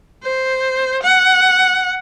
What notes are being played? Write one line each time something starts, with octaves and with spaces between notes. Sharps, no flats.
C5
F#5